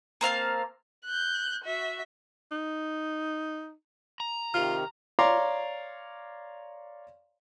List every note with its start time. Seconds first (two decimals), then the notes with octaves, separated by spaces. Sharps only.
0.21 A#3 C4 F5 A5
1.05 F#6 G6
1.64 F#4 E5
2.52 D#4
4.20 A#5
4.54 C3 D#3 F4 F6
5.19 C#5 D5 F5 A#5 C6 D6